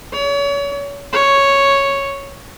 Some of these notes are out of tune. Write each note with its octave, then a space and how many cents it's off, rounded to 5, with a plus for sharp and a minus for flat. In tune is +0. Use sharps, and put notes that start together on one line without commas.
C#5 +35
C#5 +0